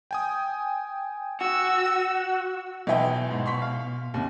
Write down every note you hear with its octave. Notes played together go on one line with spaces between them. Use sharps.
G5 G#5 D#6
F#4 E6
B1 B2 E3 D#5 E5 G5 G#5
G#2
C6 C#6 B6
F5
D#2 C3 C#4